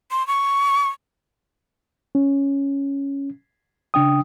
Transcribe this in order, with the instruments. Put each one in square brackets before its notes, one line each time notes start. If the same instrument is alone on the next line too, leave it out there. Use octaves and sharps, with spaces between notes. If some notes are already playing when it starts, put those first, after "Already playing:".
[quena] C6
C#6
[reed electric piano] C#4
C#3 D4 G5 D#6